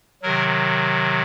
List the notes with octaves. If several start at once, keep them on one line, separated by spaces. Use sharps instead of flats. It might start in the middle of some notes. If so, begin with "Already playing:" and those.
C3 D#3 F#3 A#4